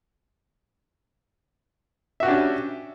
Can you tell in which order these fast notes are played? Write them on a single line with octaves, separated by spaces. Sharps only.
E5 F#4 G4 D4 C#4